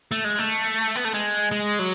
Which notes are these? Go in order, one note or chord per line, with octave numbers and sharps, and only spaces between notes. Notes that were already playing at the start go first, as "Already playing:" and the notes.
A3
G#3
A3
B3
A3
G#3
G#3
F#3